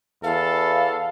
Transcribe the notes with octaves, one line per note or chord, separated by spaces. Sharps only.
E2 A4 F5